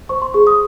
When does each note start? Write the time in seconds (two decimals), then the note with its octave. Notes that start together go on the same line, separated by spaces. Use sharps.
0.09 C5 C#6
0.22 C6
0.34 G#4 C#6
0.47 D#6